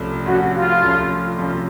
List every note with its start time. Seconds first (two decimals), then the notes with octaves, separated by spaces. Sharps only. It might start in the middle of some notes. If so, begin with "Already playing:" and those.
Already playing: C2 C3 F3 A3 C#4
0.25 C2 C3 F3 A3 C#4 F#4
0.54 F4
0.83 C2 C3 F3 A3 C#4
1.38 C2 C3 F3 A3 C#4